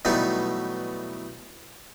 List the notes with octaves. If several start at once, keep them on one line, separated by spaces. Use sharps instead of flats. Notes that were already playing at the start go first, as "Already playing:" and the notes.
B2 E3 F#3 G3 A3 D#4